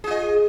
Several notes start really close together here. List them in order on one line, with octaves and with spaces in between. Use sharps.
G#4 F4 D#5